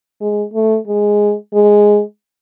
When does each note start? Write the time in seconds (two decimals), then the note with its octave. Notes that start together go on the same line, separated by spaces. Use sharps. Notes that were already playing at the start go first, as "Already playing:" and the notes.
0.21 G#3
0.54 A3
0.88 G#3
1.54 G#3